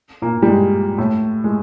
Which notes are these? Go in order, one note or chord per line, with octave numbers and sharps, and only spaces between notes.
A#2 A#3
G3
G#3
A2 A3
G#3